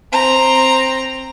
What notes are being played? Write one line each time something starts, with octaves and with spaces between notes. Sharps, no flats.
C4 A#5